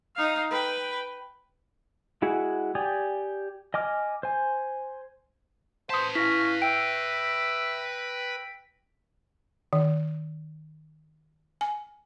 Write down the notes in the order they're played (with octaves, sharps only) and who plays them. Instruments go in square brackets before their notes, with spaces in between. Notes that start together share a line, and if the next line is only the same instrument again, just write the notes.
[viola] D#4 F5
B4 G5
[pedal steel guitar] G#3 E4 F#4 G#4 F#5
G4 D5 G#5 D#6
D#5 G#5 D6 F6
C5 G#5
[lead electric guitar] B4 A5 [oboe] C5 [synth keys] D#6 B6
[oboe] C#4 [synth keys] E4 F5 [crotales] A#6 B6
[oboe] E5 [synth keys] G5 E6 [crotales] D7
[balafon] D#3
G#5